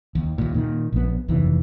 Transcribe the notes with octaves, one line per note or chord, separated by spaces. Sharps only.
D#2
D#2 A#2
A#2 D#3
A#1 B3
F1 D#2 D#3 E3